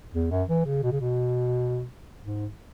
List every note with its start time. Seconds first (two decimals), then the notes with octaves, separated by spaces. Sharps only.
0.14 E2
0.31 F#2
0.49 E3
0.66 C#3
0.83 B2
0.92 C#3
1.00 B2
2.22 G#2